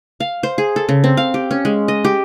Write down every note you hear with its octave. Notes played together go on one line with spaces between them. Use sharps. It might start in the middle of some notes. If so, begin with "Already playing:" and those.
F5
C5
G#4
A4
C#3
C4
F5
G4
C#4
G#3
D#5
G4